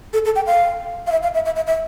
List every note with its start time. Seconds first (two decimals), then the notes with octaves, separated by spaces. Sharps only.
0.13 A4
0.25 A4
0.36 G5
0.46 F5
1.07 F5
1.12 E5
1.23 F5
1.34 E5
1.45 E5
1.56 E5
1.67 E5